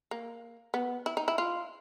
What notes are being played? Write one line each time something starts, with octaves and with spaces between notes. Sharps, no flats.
A#3
B3
E4
D#4
E4
F4